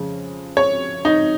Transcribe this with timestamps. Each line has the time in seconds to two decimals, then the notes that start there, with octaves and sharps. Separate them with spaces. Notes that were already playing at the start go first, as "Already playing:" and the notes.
Already playing: F2 C#3 G#3
0.57 C#5
1.05 D#4